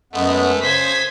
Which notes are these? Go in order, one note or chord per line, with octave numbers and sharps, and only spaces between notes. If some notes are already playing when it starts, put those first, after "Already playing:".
F#2 G#3 A3 B3
C#3 C5 G#6 B6